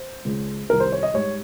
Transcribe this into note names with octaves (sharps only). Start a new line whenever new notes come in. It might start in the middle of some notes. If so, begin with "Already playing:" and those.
Already playing: C5
C#2 C#3 G#3
C2 C3 D#3 A#4
C5
C#5
D#5
G#2 G3 C#5